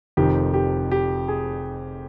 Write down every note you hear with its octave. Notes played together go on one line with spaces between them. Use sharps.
F1 F2 D#3 G4
G4
G4
G#4